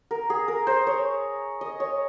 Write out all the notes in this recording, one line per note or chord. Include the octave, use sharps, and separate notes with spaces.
A#4
G#4
A#4
C5
C#5
D#5
C#5